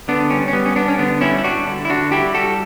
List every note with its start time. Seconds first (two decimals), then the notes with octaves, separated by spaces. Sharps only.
0.08 D3 B3 D4
0.30 G3 C#4
0.48 C#4
0.53 G3 B3
0.66 C#4
0.76 G3 B3 D4
0.88 C#4
0.98 D3 B3 D4
1.21 G3 C#4 E4
1.38 E4
1.44 G3 D4 F#4
1.67 D3
1.85 E4
1.89 D3 D4 F#4
2.12 G3 E4 G4
2.34 G3 F#4 A4